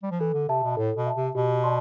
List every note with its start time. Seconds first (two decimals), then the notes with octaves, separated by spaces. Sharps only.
0.03 G3
0.11 F3
0.20 E3 A4
0.34 D3
0.49 C3 E5 A5
0.63 B2
0.77 A2 A4
0.97 B2
1.06 E5 A5
1.16 C3
1.35 B2 G4
1.64 D5 A5 C6